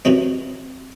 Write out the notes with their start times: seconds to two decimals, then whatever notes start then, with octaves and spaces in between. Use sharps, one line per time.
0.05 F#2 C3 E3 F#3 C4